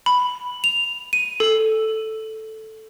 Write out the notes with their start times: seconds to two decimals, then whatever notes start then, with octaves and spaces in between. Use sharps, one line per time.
0.06 B5
0.64 F7
1.13 D#7
1.40 A4